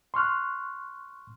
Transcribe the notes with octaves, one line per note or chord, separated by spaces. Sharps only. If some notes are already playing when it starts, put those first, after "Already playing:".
C6 C#6 F6 F#6